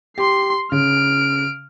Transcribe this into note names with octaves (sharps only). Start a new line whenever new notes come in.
G4 C6 C7
C#3 F6 D7